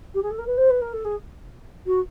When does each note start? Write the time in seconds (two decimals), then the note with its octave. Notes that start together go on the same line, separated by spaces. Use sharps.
0.14 G4
0.22 G#4
0.30 A4
0.38 A#4
0.46 B4
0.57 C5
0.70 B4
0.81 A#4
0.93 A4
1.04 G#4
1.86 F#4